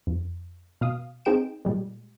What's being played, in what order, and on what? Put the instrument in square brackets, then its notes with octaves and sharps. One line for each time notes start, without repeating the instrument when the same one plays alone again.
[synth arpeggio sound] F2
B2 F5 D#6
C4 D#4 G#4 G5 D7 E7
A#2 G3 G#3